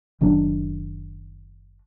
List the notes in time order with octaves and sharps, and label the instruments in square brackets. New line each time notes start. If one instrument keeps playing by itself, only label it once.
[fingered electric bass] F#1 D#3 F#3 D4